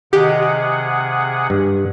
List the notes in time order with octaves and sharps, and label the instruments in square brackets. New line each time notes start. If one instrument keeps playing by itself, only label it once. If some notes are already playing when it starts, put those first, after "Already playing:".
[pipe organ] C3 G#4 F#5 [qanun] D#3 A#5 [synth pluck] G4
[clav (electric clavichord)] G2